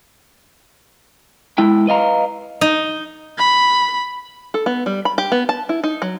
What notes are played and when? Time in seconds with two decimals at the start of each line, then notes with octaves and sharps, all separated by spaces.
1.58 G#3 E4 G5
1.87 B4 D#5 F5 A#5
2.61 D#4
3.38 B5
4.54 A4
4.66 B3
4.86 G3
5.05 B5
5.18 G4
5.32 B3
5.49 A5
5.69 E4
5.84 D#4
6.02 F#3